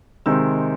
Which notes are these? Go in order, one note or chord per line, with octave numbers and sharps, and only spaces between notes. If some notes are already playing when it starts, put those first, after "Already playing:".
C3 D#3 G#3 C4 E6